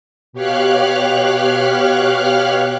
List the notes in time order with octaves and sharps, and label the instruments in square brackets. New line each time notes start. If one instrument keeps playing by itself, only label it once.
[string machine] B2 G4 C#5 F5 F6 F#6